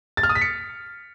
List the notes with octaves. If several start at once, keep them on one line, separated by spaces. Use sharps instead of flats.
A6
F6
D#6
B6
C#7